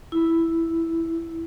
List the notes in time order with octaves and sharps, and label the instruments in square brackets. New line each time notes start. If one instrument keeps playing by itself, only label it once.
[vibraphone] E4